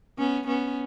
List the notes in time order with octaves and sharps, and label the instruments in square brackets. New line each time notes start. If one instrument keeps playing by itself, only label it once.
[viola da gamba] B3 C#4
B3 C#4